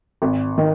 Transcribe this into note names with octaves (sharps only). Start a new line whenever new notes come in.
G#1
D#3